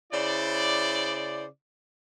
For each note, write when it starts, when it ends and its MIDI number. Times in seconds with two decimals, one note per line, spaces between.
0.13 1.46 49
0.13 1.46 64
0.13 1.46 72
0.13 1.46 74